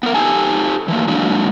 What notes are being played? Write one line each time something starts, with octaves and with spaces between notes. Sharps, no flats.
B3 A#4
D#4 G4 A4 G#5 A5
E3 A3 A#3
F#3 G#3 A#3 D4